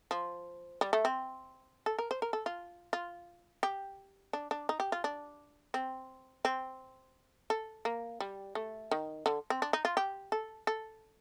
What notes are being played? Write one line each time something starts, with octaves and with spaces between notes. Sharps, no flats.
F3
G3
A3
C4
A4
A#4
C5
A#4
A4
F4
F4
G4
D4
D4
D#4
G4
F4
D4
C4
C4
A4
A#3
G3
A3
D#3
D3
C4
D4
D#4
F4
G4
A4
A4